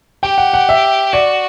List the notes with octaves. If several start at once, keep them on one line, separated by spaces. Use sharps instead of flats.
G4 G5
F#5
F#5
E5
F#4 D5